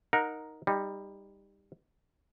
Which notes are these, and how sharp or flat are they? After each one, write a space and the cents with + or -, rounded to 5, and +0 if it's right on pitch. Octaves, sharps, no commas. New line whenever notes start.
D#4 +0 A#4 +0 F#5 -25
G3 +15 D#4 +0